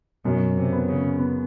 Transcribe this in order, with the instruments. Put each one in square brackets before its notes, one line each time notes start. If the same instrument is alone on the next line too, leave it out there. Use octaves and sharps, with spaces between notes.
[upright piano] F#2 [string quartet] B2
[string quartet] C3
[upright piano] B3
[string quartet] C#3
[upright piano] B3